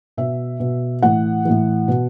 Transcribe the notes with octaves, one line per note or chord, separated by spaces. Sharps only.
B2 E5
B2
A2 E3 F#5
A2 E3
B2